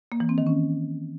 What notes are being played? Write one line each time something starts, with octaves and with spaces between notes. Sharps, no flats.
A#3
E3
C4
D#3
C#4